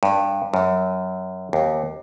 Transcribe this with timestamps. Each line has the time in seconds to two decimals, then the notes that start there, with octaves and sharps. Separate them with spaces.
0.03 G2
0.54 F#2
1.53 D#2